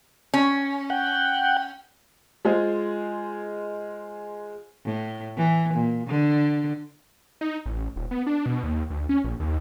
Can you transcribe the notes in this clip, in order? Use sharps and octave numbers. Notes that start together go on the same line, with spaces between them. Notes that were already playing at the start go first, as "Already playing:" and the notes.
C#4
F#5 G5
G#3 F4 G#4 C5
A2
E3
A#2
D3
D#4
A1
D#1
B3
D4
B2
D#2
D2
C#4
A#1
D#2